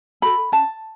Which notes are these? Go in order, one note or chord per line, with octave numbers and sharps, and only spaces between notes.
F#4 A4 B5
C#4 A5